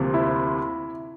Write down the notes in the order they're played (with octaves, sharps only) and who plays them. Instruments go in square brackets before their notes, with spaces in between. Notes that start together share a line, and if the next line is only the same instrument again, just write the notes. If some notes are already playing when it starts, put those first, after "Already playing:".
Already playing: [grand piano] D2 C3 F3 A#3
E4